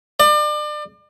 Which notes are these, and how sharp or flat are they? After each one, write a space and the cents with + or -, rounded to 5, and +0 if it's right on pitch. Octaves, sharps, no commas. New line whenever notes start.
D5 +35